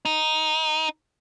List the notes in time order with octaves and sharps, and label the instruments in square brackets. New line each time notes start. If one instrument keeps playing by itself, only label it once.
[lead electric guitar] D#4